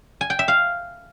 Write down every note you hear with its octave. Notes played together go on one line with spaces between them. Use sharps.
G#5
G5
E5
F5